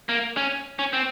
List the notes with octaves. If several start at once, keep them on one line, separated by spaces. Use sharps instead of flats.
A#3
C#4
C#4
C4